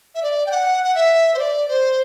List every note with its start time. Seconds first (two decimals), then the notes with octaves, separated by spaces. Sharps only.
0.15 E5
0.23 D5
0.46 G5
0.51 F#5
0.84 F#5
0.95 E5
1.34 C5
1.39 D5
1.68 C5